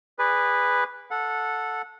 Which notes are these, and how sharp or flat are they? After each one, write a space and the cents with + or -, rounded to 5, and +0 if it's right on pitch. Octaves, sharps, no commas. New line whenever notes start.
G#4 -25 B4 +0 D5 -15
A4 +0 F#5 -20